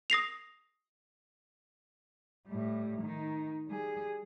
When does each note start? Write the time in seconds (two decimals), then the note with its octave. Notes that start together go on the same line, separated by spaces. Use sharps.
0.10 D#6 A#6 C7 F7
2.48 A2 G3
3.02 D#3 D#4
3.68 G3 G#4